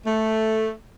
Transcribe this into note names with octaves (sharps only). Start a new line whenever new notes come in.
A3